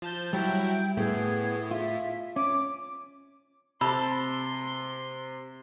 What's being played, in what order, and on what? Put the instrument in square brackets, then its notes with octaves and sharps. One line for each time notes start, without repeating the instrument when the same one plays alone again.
[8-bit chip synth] F3 A5 G6
[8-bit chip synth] F#3 E4 [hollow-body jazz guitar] G3 [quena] G5
[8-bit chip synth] A2 [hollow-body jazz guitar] A3 B3 E4 [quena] G#4
[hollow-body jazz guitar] F4 [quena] E5
[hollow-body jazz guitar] C#4 [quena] D6
[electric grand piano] C3 [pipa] A4 [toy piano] B5 [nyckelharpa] C6